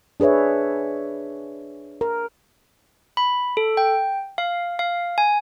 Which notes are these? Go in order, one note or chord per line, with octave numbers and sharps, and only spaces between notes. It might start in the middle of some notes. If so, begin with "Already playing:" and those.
D4 G#4 B4 C#5 E5
A#4
B5
A4
G5
F5
F5
G#5